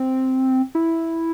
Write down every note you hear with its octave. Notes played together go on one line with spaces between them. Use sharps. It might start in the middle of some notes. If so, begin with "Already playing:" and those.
Already playing: C4
E4